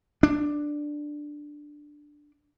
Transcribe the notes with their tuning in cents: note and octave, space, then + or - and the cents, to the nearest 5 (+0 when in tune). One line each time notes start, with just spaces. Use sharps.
D4 +5